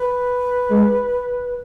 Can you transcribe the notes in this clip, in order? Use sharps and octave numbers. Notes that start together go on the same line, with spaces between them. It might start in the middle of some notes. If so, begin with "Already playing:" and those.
Already playing: B4
G#3